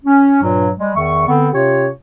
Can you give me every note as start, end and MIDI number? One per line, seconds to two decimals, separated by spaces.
0.04 0.41 61
0.42 0.69 43
0.42 0.69 46
0.42 0.69 54
0.78 0.91 55
0.78 0.91 56
0.96 1.24 40
0.96 1.24 51
0.96 1.24 76
0.96 1.24 85
1.27 1.48 50
1.27 1.48 59
1.27 1.48 60
1.53 1.88 48
1.53 1.88 61
1.53 1.88 65
1.53 1.88 67
1.53 1.88 73